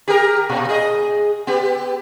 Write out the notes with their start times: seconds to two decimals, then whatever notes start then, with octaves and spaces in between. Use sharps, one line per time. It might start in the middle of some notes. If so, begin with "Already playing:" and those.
0.08 G4 G#4 A#4
0.49 A#2
0.69 G#4 D#5
1.47 B3 G4